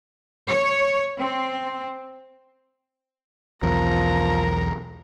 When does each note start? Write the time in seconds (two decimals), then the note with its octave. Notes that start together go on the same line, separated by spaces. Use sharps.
0.46 C#5
1.20 C4
3.63 B1 E2 F3 A#4 A#5